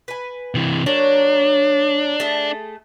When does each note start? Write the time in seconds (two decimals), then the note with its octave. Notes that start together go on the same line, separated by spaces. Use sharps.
0.08 B4 G#5
0.55 C3 E3
0.86 F#3 A#3 D4 C#5
2.20 A3 G#4 A4